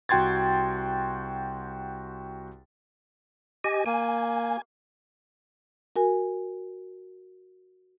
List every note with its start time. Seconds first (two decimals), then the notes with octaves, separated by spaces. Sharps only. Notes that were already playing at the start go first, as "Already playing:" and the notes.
0.09 C2 F#4 G5 C6 G#6 A6
3.64 G4 D#5 G#5
3.86 A#3 G#5
5.96 F#4 A#4 G#5